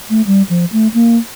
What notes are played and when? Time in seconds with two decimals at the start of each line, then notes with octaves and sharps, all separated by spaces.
0.10 A3
0.27 G3
0.49 F3
0.72 A3
0.94 A#3